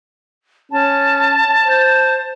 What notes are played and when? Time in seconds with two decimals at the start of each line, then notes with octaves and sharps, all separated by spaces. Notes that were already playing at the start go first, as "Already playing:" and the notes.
0.72 C#4 A5
1.63 C5